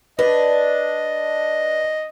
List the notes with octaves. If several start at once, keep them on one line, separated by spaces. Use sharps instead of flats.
D4 B4 D#5